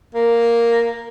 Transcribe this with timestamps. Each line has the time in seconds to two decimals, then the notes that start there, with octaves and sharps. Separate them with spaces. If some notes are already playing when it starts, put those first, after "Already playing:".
0.14 A#3